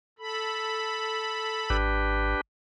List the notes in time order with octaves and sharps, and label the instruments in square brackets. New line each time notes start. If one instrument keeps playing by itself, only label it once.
[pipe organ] A4 B5
[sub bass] G#1 [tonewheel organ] D4 G4 B4